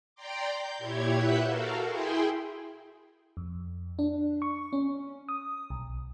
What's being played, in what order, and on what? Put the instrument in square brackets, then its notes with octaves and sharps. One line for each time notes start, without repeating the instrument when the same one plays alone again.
[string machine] D5 G5 A#5 C6 D6
G6
A#2 E4 G4 C#5 G#6
B4 E5 F#5 E6 F#6 G6
F#4 A4 A#4 F5
E4 G#4 G5 C6
[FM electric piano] F2
D4
C#6
C#4
D#6
B1